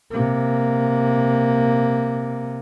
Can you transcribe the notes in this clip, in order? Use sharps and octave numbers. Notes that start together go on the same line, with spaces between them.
C3 A#3